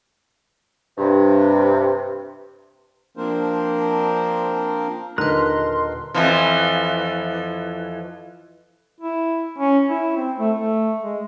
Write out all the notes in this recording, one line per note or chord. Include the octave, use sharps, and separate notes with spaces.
G2 C3
F3 A#3 C4 D4 A#4 C5
D#1 D3 D#4 A#4 B4 D#5 C6 F#6
F2 E3 F3
E4
C#4
E4
C4
A3
A3
G#3